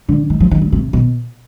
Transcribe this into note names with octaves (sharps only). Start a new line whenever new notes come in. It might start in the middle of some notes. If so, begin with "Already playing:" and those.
D3
D#3
F3
D#3
D3
C3
B2